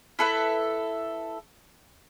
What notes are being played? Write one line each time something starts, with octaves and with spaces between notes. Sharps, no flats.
E4 A4 B4 E5